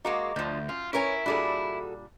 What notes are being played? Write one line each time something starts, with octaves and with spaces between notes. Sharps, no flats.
G#3 A#3 F#4 D#5 A#5 D6
D2 D3 F3 G6
F#2 F4
C#4 E4 A#4 B4 C#5 G#5 D7
A#2 G3 D4 F#4 G#4 A4 B5